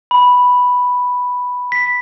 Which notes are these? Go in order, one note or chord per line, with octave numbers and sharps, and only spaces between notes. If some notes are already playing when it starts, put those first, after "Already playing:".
B5
B6